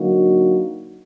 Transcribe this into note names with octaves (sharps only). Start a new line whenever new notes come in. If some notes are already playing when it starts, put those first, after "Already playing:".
Already playing: D3 F#3 A#3 D#4 F#4